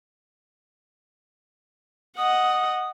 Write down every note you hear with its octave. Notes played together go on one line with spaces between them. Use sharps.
D#5 F#5 D#6